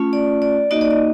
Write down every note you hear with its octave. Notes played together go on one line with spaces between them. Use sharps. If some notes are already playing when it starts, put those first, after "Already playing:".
Already playing: A3 C#4 F4
D5
D5
A#3 D#4 F#4 D#5
D5
D#5